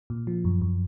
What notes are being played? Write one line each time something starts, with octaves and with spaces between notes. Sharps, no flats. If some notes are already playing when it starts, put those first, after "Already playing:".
A#2
F3
F#2
F#2